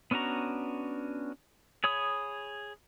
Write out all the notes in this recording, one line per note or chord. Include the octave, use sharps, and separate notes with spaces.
B3 C#4 D4 F#4 A#5
G#4 C#5 B5 D#6